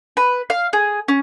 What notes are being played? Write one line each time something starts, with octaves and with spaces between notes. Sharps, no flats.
B4
F5
G#4
C#4